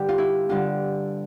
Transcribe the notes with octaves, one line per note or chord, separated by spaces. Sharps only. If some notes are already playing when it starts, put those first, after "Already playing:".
Already playing: G2 D3 G3 G4
F4
E4
G2 D3 G3 F4